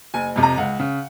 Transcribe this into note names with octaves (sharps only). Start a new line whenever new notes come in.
F#1 G#5
F2 C3
A#5
C#2 F#5
C#3